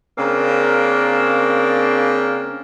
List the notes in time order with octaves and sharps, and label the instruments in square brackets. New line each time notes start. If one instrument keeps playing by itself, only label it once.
[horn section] C#3 A#3 C4 D4 A#4